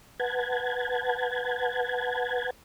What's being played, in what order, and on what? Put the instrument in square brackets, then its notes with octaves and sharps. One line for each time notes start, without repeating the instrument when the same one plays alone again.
[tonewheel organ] B4 F#5 A5 G#6